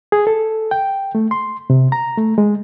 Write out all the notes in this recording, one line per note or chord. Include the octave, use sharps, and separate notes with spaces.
G#4
A4
G5
A3
C6
C3
A#5
A3
G#3